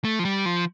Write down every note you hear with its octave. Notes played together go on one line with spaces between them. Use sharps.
A3
F3
G3
F3